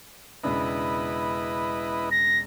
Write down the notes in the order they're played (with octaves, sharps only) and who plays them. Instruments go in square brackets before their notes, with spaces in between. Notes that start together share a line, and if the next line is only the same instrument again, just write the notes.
[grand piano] E1 C#3 D4 [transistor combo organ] E4 B4 D#5
[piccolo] A#6